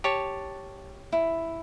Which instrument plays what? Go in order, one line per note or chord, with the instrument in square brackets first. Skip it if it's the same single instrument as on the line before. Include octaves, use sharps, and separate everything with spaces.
[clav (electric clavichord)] G4 C#5 [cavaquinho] A5
[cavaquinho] E4